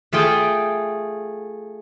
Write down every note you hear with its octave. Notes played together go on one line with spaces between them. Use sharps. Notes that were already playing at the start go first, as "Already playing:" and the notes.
A3 F4 G#4 G5